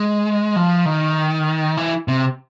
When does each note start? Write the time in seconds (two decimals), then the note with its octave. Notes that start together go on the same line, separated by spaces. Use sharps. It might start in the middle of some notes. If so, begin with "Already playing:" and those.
Already playing: G#3
0.56 F3
0.85 D#3
1.77 E3
2.08 C3